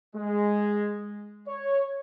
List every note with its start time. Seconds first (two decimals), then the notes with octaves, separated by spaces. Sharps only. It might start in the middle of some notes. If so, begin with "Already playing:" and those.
0.16 G#3
1.48 C#5